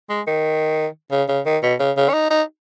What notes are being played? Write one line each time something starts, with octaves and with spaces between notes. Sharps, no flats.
G#3
D#3
C#3
C#3
D#3
B2
C#3
C#3
C#4
D#4
D#4